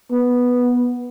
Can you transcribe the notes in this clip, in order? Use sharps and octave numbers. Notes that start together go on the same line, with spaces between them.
B3